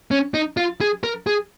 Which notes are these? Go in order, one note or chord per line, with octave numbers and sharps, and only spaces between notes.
C#4
D#4
F4
G#4
A#4
G#4